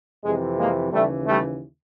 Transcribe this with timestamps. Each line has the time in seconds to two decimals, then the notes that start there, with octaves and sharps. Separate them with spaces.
0.23 F2 C3 E3 G#3
0.57 G#3 A#3
0.91 D#2 C#3 E3 G3 A3
1.27 G3 A3